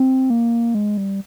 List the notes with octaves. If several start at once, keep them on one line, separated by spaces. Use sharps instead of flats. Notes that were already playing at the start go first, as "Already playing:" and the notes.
Already playing: C4
A#3
G#3
G3